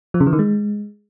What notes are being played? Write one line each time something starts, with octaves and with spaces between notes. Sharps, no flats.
F3
C#3
E3
D#3
G#3